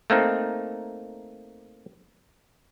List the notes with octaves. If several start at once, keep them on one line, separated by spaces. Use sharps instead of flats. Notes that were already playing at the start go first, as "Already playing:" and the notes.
A3 A#3 C4 D#4